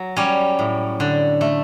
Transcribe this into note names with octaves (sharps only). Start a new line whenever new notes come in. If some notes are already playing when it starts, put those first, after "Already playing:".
Already playing: F#3
G3 C#4
A2
D3
A3